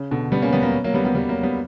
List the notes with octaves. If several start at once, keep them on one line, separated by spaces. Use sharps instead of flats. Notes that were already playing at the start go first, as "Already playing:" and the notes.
Already playing: C#3
B2 D3
G3 B3
A#3 C#4
G3 B3
F#3 A#3
F#3 A#3
G3 B3
G3 B3
G3 B3
F#3 A#3
G3 B3